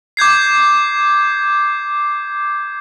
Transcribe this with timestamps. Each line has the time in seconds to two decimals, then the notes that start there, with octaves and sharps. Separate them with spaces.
0.17 D6 G6 G#6 C7